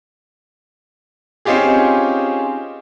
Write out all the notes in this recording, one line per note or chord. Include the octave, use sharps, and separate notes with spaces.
C4 C#4 D#4 F4 G4 G#4